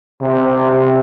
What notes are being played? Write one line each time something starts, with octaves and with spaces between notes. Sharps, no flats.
C3
C3